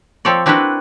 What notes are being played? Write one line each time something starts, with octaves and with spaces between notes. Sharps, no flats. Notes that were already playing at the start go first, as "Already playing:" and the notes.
F3 C4 A4 C#5 D5
C4 D4 E4 F#4 A#4 B4